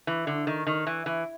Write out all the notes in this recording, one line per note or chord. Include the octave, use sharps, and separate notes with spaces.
E3
D3
D#3
D#3
E3
E3